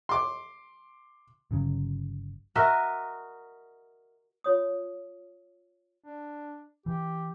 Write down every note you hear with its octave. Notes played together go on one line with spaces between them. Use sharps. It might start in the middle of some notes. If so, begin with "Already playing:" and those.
C6 D6
G1 C#3 F#3
F#4 A#4 D#5 E5
F4 C#5 D#6
D4
E3 G4